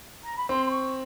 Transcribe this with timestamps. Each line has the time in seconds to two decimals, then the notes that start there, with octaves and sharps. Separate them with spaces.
0.24 A#5
0.37 B5
0.49 C4 C6
0.66 C6
0.71 C#6